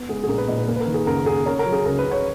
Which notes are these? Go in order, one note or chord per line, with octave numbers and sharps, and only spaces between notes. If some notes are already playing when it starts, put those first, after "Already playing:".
Already playing: B3
G#3 G#4
G#4
A#1 A#4
B4
A#2 D#5
B4
A#3 A#4
B4
A#4
D#3
G#4
F#1 A#4
F#2 G#4
C#4 A#4
A#4
F#3
G#4
C#2 A#4
B4
C#3
C#5